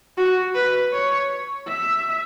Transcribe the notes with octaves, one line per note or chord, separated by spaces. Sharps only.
F#4
B4
C#5
E5